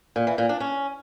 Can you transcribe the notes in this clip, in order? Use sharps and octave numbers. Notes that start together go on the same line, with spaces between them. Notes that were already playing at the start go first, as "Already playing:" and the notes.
A#2
E3
A#2
D4
C#4